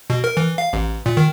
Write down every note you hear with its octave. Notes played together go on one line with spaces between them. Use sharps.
B2
A#4
E3
F5
A1
A#2
D#3